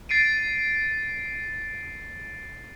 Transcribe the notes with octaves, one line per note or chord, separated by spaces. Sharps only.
A6 C7 D7 D#7